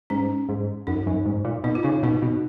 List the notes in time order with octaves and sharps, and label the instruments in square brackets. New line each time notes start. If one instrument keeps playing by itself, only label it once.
[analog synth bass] G#2 [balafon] C#4
[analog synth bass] G#2
[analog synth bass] F#2 [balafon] D#4
[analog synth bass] F#2
G#2
A#2
[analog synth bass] B2 [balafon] D#4
[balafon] F4
[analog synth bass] C#3 [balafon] D#4
[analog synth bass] B2 [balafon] D#4
[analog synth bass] B2